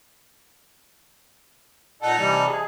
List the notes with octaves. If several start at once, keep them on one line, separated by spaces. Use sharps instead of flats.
A#2 D#4 A4 F#5
C3 E3 G3
G#4